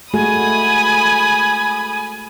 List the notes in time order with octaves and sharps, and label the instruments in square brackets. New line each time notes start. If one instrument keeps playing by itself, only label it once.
[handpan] G#3 A3 F#4 [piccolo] G#5 [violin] B5 D#6